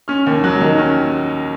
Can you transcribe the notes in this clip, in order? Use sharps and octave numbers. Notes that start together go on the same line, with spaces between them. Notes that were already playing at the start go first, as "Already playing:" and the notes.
C#4 F6
D#2
F#3 F#6
D#3
C#4 F6